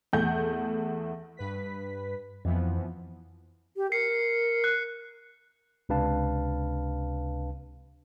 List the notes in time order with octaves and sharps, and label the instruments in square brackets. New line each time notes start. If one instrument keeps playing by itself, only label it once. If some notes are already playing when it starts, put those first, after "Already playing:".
[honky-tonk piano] E2 A3 F#5 G6
[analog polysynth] G2 B4 B6
[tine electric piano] F2 [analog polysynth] E3 F3 B3
[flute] G4
[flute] A#4 [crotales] C7 C#7
[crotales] F#6
[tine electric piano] C#2 C3 D4 B4 F5 A5